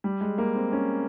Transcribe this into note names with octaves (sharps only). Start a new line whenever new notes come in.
G3
G#3
A#3
C4
C#4